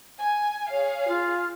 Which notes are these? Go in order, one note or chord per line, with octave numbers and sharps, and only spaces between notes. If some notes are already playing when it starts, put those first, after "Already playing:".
G#5
G#4 C#5 F5
F4